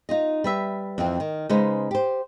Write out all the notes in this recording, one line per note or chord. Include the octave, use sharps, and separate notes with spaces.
D#4 F4 D#5
G3 B4 E5
F2 E3 C4
D#3
C#3 G#3 D#4 B4 C5
G4 C5